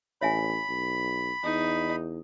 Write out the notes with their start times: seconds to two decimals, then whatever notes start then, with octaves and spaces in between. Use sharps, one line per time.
0.21 A1 C#5 E5 G#5 B5
0.69 B1
1.44 E2 D#4